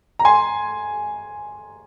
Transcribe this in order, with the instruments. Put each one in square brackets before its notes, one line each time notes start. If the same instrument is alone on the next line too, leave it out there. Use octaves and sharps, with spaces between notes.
[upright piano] A#5
G#5 C6